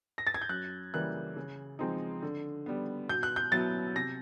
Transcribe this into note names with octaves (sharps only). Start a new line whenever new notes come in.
A#6
A6
G#6
G6
F#2 F#6
C#3 E3 G3 A#3 F#6
C#3
F3 G#3 C4 D#4
D3
G3 B3
B2 G6
F#6
G6
F#3 B3 E4 A6
C3 A#6